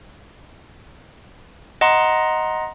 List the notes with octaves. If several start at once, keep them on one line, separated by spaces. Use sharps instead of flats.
D#5 F#5 A#5 C6